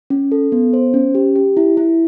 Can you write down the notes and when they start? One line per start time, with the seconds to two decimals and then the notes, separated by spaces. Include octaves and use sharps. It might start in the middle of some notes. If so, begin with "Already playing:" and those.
0.10 C#4
0.32 A4
0.52 B3
0.73 C5
0.94 C#4
1.15 G4
1.36 G4
1.57 E4
1.77 E4